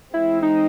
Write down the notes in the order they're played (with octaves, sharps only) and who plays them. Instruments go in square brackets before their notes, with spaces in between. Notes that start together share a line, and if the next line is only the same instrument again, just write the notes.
[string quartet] E3 G#3 C4 [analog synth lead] E4
[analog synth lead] D#4